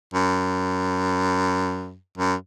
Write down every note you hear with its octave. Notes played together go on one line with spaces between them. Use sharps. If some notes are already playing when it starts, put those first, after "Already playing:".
F#2
F#2